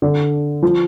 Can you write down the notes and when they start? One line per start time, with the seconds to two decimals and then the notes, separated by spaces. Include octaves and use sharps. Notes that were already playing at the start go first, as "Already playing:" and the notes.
0.02 D3
0.62 F3